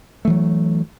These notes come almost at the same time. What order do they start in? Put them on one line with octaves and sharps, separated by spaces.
A3 E3 F#3